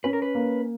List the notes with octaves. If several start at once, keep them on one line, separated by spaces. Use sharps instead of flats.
C#4 B4
A#4
B4
A#3